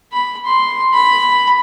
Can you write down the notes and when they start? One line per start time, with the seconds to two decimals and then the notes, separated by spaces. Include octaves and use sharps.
0.12 B5
0.45 C6
0.93 B5